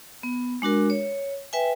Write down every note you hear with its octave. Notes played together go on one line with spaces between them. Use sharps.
B3
G#3 D4 F#4 A#4
C#5
B4 E5 G5 G#5